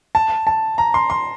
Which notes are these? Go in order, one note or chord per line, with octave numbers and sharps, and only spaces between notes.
A5
A5
A#5
C6
C6